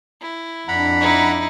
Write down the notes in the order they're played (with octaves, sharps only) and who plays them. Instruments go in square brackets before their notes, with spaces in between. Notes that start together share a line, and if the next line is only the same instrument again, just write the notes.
[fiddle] E4
[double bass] F2 D4 [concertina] F#5 A#5 B5 [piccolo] B6
[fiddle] D#4 E4